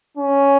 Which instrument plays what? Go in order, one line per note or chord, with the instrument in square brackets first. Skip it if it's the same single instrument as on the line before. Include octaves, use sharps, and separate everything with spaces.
[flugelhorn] C#4